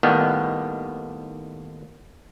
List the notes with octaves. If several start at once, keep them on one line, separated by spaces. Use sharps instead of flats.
D#2 A2 D#3 G3 B3